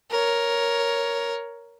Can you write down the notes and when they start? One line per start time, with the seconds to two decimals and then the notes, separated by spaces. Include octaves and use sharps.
0.11 A#4 C#5